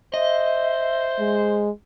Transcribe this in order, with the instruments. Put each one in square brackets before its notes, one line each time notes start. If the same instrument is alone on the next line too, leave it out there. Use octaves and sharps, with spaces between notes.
[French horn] C5 [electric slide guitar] D#5 [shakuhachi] E5
[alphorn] G#3